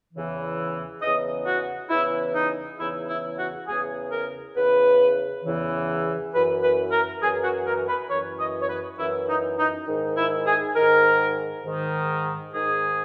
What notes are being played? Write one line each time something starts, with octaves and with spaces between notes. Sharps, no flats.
E2 C#3 E3
E2 C#3 E3 D#5
F#4
E2 C#3 E3 E4
D#4
E2 C#3 E3 E4
E4
F#4
E2 C#3 E3 G#4
A#4
E2 C#3 E3 B4
E2 C#3 E3
F#2 E3 B4
B4
A#4
F#2 E3 G#4
F#4
A#4
B4
F#2 E3 C#5
D#5
C#5
B4
F#2 E3 E4
D#4
D#4
G#2 D#3
E4
G#4
G#2 D#3 A#4
G#2 D#3
G#2 D#3 G#4